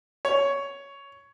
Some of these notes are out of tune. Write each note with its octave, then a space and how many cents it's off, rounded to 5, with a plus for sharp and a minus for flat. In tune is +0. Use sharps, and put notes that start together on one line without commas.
C#5 +10